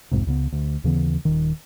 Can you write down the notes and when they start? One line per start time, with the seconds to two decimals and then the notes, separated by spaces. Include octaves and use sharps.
0.11 A#1 F2 G#2 C3
0.27 C#2 C#3 B3
0.52 D2
0.84 D#2 C#3 E3 B3
1.25 D#1 D#3